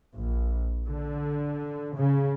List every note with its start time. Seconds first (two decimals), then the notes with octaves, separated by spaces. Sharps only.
0.14 A#1
0.86 D3
1.97 C#3